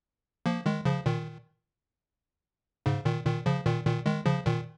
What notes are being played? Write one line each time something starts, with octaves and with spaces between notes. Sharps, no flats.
F3 A#3
D#3 G#3
C#3 F3
A#2 D#3
G#2 C#3
A#2 D#3
A#2 D#3
C#3 F3
A#2 D#3
A#2 D#3
D#3 G#3
C#3 F3
A#2 D#3